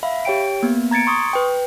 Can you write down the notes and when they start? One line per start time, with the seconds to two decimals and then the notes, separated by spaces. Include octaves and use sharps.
0.03 E5 F5 B5
0.25 G4 C#5 G5 D7
0.63 A#3 B3
0.91 A#5 G#6 A6 C#7 D7
1.07 C6 C#6 D#6
1.33 B4 G5